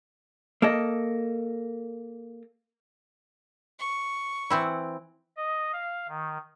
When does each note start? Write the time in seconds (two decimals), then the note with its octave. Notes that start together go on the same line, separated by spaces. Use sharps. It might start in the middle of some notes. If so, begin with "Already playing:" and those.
0.62 A#3 A4 D#5
3.79 C#6
4.50 E3 C4 E4
5.37 D#5
5.73 F5
6.09 D#3